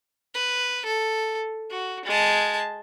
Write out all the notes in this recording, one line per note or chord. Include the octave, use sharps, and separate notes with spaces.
B4
A4
F#4
G#3 A5